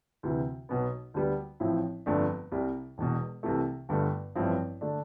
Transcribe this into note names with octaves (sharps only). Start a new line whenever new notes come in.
D2 C3 E3
B1 B2 B3
D2 D3 G3 B3
A1 A2 F3 C4 E4
G1 F2 D3 A3 D4
C2 C3 G3
E1 E2 B2
C2 C3 E3 A3
G1 G2 D3 A3
A1 G2 F3 C4 E4
D3 A3 D4